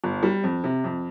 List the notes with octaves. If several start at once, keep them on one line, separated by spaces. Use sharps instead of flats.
G1
G3
F2
C3
F2